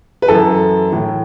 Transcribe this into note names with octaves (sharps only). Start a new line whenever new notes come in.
B4
F#2 E3 A4
A2 E3